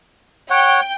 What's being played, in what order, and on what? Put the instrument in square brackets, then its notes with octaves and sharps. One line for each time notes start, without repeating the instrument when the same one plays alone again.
[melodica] C#5 F#5 [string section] G5